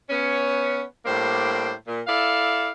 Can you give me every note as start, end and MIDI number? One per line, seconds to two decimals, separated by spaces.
0.09 0.83 59
0.09 0.83 61
1.05 1.71 45
1.05 1.71 55
1.05 1.71 58
1.05 1.71 62
1.05 1.71 72
1.87 2.01 46
2.07 2.69 64
2.07 2.69 69
2.07 2.69 74
2.07 2.69 77